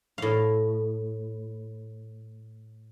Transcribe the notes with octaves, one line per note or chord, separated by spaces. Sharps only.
A2 F5